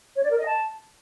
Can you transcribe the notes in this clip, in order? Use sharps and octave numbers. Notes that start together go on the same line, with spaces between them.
C#5
D5
A#4
D#5
A5